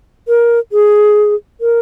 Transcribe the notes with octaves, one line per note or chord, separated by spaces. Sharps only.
A#4
G#4
A#4